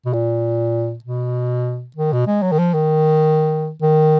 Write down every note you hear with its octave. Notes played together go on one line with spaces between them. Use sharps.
B2
A#2
B2
D#3
B2
G#3
F#3
D#3
F3
D#3
D#3